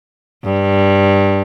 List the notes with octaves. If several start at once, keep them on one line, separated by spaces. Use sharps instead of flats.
G2